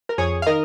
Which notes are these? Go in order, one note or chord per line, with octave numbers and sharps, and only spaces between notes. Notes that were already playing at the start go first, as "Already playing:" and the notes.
A#4
F2 G#4 C#5
F5
D#3 A#4 D#5